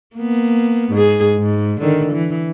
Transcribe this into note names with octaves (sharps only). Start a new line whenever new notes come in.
A#3 B3
G#2 G#4
G#2
D3 D#3
E3